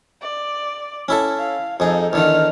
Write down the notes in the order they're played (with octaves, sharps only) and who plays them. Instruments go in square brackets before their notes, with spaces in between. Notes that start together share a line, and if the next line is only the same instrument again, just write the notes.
[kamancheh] D5
[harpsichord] C#4 E4 A4
[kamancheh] F5
[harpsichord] F2 G#4 [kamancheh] D#4 A4
[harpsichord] E2 D3 D#3 [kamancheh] D#4 F6